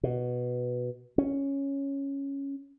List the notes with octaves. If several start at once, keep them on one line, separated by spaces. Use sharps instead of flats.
B2
C#4